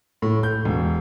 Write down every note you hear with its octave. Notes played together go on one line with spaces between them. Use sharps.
A2
G6
E1